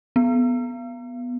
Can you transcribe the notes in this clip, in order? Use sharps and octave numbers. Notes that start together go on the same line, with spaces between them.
B3